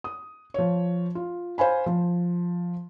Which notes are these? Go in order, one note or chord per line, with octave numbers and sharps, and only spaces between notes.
D#6
F3 C#5
F4
C5 F5 G#5 B5
F3